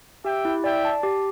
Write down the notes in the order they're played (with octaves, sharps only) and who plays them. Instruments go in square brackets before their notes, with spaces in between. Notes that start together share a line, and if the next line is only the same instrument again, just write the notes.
[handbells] G4 [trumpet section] E5 G5
[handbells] E4
[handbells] D5 [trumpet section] E5 G5
[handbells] A5
G4